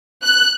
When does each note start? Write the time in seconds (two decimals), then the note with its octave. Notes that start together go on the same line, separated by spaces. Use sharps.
0.23 F#6